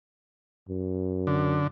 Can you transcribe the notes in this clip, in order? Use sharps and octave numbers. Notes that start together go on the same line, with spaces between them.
F#2
D3